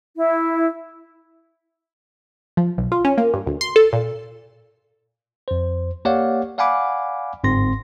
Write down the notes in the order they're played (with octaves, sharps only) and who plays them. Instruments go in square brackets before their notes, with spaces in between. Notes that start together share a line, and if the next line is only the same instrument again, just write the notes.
[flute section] E4
[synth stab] F3
B1
F4
C#4
A#3
G2
D2
C6
A4
A#2
[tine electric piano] F2 C5
A#3 G4 C#5 D5 F5 F#5
D5 F5 F#5 G#5 B5 D6
G1 G#2 C4 C6 A#6